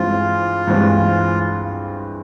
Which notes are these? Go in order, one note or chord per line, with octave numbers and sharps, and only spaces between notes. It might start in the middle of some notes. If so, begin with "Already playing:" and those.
Already playing: G2 E3 G#3 C4 F4
G2 E3 G#3 C4